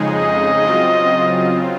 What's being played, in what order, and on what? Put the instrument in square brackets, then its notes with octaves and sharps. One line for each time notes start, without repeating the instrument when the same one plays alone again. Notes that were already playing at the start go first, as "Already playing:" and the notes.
Already playing: [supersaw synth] F2 C#3 G#3 D#4 G#4
[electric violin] D#5
[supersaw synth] C#3 F#3 C4 F4